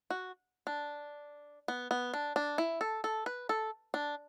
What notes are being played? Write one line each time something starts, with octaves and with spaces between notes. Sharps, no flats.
F#4
D4
B3
B3
D4
D4
E4
A4
A4
B4
A4
D4